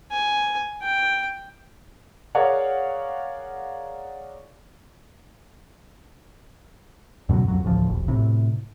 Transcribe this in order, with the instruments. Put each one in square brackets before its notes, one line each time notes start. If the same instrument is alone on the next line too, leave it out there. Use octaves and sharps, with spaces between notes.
[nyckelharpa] G#5
G5
[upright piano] G#4 A#4 C#5 D5 F5 F#5
[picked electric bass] F#2 B2 D3 F#3
C2 F2 F#3
A1 D2 F3
E1 A#1
A2 C3